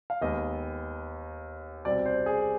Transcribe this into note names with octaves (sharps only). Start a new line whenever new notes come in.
F5
D#2 D#3 G#3 B3 D#5
C2 B2 G3 C4 D5
C5
G#4